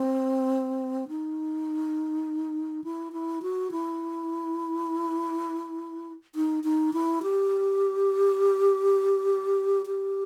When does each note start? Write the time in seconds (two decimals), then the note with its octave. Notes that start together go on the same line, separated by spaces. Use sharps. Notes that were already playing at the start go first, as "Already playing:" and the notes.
Already playing: C4
1.09 D#4
2.84 E4
3.13 E4
3.42 F#4
3.72 E4
6.35 D#4
6.64 D#4
6.94 E4
7.23 G4
9.86 G4